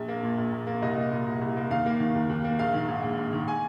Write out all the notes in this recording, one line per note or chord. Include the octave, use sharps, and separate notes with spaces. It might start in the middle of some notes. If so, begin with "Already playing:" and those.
Already playing: A#1
A#3
A#2
A#1
A#1
A#3
C2 D#5
A#3
A#2
C2
C2
A#3
D#2 F5
A#3
D#3
D#2
D#2
A#3
A#1 F5
D#3
G#2
A#1
A#1
D#3
G#5